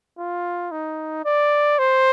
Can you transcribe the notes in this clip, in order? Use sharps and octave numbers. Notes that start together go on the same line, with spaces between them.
F4
D#4
D5
C5